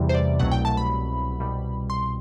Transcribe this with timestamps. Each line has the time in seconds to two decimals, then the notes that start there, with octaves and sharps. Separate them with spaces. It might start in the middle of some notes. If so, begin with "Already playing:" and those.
Already playing: E2 C3 E3 G3
0.09 C5
0.14 D5
0.39 C2 B2 F#3 A3 F#5
0.51 G5
0.65 A5
0.77 B5
1.39 C2 B2 G3
1.90 C6